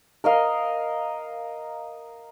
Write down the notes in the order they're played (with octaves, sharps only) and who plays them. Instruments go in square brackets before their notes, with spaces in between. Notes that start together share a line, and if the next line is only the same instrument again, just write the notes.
[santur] A#4 D#5 F5